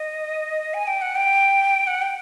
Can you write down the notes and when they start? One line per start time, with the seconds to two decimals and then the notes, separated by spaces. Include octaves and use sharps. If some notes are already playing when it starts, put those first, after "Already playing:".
Already playing: D#5
0.74 G#5
0.87 G5
1.02 F#5
1.16 G5
1.87 F#5
2.02 G5